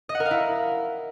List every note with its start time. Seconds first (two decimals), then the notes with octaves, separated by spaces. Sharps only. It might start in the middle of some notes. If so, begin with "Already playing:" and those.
0.09 D#5
0.15 F#5
0.20 A#4
0.25 F5
0.31 E4